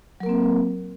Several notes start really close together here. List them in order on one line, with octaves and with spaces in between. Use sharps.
F#3 A#4 A#3 C4